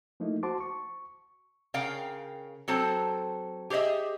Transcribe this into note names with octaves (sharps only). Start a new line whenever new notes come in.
F3 A3 A#3 D#4 E4
F#4 C5 A5 C6 D6
C#6
C#3 A#4 F5 G5
F#3 C4 A4 C5 A5
G4 G#4 C5 D#5 E5